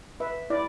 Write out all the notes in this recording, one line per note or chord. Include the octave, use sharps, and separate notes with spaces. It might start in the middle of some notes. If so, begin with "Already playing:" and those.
B4 E5
E4 D5